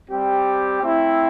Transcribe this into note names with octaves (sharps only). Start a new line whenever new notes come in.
G3 C4 G4
A3 C4 E4